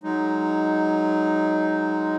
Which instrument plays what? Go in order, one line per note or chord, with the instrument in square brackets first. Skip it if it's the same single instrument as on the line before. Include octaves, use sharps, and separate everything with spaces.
[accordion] F#3 G#3 D#4